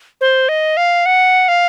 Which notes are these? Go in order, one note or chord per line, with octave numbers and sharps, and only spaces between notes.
C5
D#5
F5
F#5
F5